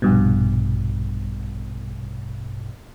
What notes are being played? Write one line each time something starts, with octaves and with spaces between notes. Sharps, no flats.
A#1 G2 B2